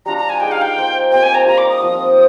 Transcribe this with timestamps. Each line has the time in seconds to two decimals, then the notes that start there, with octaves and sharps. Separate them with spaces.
0.06 G3 D4 F4 A#5
0.17 A#5
0.29 G#5
0.40 D#4 G#4 D#5 G5
0.51 F5
0.61 G5
0.76 A#3 F4 C5
1.11 C4 G4 A#4 G5
1.23 G#5
1.34 A#5
1.46 G3 A#3 F4 C5 A#5
1.58 D6
1.69 D#6
1.82 F3 C4 F4